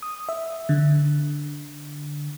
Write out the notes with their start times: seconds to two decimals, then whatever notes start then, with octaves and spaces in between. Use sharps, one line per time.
0.02 D#6
0.29 E5
0.69 D3